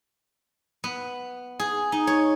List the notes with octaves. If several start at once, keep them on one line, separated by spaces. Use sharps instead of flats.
B3
G#4
D#4
C#5